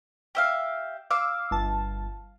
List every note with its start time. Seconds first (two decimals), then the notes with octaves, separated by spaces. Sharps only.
0.35 G4 E5 F5
1.11 F5 D6 E6
1.51 G1 A5